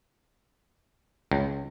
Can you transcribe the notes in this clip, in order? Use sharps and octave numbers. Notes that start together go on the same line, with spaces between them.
C#2